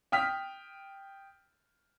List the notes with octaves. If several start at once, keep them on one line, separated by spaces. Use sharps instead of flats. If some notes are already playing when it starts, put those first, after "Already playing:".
G5 D#6 F6 B6